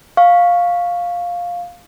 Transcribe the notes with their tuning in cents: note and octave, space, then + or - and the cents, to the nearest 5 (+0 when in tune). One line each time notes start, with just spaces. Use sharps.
F5 +10 C#6 +0